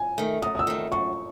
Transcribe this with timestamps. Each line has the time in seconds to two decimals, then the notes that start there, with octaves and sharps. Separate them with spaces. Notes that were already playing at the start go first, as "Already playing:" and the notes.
Already playing: G#5
0.18 D#3 A3
0.42 F#2 D#6
0.55 D#6
0.59 E6
0.67 D#3 A3
0.92 F#2 C#6